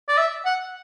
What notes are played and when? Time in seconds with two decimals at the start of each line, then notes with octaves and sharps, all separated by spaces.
0.08 D5
0.17 E5
0.45 F#5